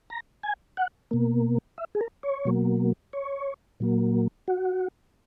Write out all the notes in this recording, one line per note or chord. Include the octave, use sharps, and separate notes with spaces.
A#5
G#5
F#5
B2 A#3
E5
G#4
A#4
C#5
B2 F#3 A#3
C#5
A#2 F#3 A#3
F#4